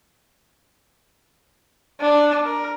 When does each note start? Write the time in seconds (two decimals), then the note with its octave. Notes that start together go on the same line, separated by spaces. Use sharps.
2.00 D4
2.45 A#4